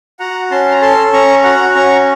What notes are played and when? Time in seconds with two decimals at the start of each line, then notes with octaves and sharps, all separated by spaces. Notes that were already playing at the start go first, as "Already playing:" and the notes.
0.19 F#4 F#5 A#5
0.51 C#4 A5 C6
0.72 A#5
0.82 A4 A5 C6
1.13 C#4 A#5 C#6
1.44 F#4 F#5 A#5
1.75 C#4 A#5 C#6